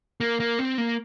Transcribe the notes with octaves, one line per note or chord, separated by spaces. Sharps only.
A#3
A#3
C4
A#3